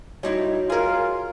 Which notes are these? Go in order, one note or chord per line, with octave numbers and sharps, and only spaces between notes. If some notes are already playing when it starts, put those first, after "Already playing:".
G3 D#4 E4 F#4 C#5
F4 G#4 A#4